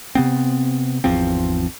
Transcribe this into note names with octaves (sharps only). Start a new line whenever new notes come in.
C3 B3 C4
G#1 E2 F3 C4